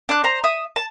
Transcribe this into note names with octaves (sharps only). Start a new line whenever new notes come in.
D4 F#6
C5 A#5
E5 D#6
A5